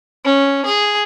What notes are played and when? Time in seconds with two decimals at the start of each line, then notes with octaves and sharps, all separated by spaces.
0.25 C#4
0.65 G#4